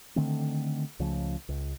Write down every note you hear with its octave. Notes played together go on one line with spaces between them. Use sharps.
D3 D#3 A3 C4
C#2 C#3 F3 A3
C#2